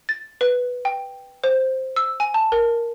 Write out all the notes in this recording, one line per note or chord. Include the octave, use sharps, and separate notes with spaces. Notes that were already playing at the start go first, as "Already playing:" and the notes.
A6
B4
G5
C5
E6
G#5
A5
A#4